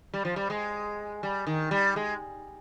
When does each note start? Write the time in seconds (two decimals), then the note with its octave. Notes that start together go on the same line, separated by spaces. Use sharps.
0.14 G3
0.25 F3
0.36 G3
0.50 G#3
1.23 G3
1.47 D#3
1.71 G3
1.96 G#3